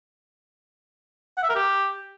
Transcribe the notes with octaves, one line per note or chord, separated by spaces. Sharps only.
F#5
E5
A#4
G4